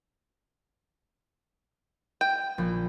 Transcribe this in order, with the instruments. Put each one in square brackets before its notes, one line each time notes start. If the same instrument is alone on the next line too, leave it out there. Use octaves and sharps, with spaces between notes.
[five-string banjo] G5
[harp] A#1